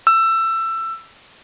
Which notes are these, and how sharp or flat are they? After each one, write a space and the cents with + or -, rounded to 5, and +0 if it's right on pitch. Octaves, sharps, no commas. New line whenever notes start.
E6 +20